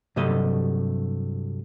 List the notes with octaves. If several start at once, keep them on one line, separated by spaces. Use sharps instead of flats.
G2 C3 F#3 A3 D#5